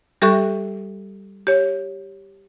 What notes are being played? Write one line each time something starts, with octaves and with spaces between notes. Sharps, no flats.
G3 G4 A4 E5 C#6 F#6
G4 C#5